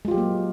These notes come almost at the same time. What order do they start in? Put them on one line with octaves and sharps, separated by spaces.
G#3 F4 G4 F#3 A#3